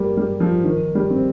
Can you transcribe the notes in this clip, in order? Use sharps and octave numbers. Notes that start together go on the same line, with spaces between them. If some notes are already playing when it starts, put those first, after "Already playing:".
Already playing: G3 A#3
G3
F3
D#3
G3
C4